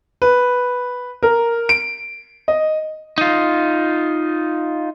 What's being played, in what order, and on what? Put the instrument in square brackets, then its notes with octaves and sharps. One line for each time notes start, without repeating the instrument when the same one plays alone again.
[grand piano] B4
A#4
D7
D#5
[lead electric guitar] D#4 F4